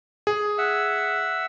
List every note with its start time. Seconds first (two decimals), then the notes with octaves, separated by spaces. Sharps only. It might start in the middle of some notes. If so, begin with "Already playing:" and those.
0.27 G#4
0.58 E5 F#5 E6